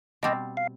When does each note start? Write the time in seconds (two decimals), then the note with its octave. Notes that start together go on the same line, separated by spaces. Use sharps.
0.23 B2 G3 C4 D#5
0.57 F5